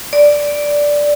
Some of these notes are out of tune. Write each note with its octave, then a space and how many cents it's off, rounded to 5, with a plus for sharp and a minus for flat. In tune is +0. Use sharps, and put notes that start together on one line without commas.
D5 -5